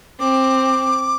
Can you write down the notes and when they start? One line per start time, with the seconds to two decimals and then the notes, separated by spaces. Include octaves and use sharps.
0.20 C4 D6